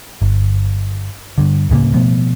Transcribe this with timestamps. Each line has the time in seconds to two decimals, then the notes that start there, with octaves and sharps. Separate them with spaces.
0.22 G1
1.38 G2 D3
1.69 D1 A2 C#3 A#3
1.94 B2 F3 A3 B3